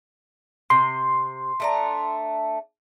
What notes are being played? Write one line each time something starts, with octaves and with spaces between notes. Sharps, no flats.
C3 C6
A3 D4 A#5